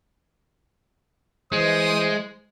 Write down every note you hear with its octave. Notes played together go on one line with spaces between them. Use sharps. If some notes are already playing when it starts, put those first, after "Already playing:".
E3 G#3 C5 D#6